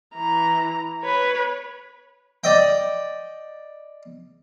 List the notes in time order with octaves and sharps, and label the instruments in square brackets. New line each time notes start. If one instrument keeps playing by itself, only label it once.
[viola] E3 A#5
B4 C#5
[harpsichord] D5 D#5 G5